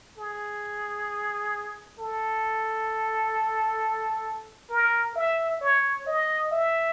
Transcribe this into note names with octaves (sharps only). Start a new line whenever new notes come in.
G#4
A4
A#4
E5
C#5
D#5
E5